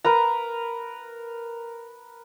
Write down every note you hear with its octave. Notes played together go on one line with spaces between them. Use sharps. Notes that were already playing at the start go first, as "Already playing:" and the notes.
A#4 B4 A#5